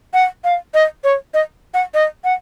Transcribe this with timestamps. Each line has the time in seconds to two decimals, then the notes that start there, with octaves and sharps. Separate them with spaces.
0.14 F#5
0.44 F5
0.74 D#5
1.04 C#5
1.34 D#5
1.74 F#5
1.94 D#5
2.24 F#5